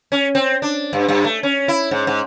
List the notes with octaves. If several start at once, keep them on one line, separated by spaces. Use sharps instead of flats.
C#4
C4
D4
G2
G2
A3
C#4
E4
G#2
G#2